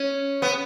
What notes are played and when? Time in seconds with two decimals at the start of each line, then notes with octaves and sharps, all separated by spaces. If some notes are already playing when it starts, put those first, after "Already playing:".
Already playing: C#4
0.42 B3